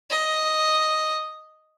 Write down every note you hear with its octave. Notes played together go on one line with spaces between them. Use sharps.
D#5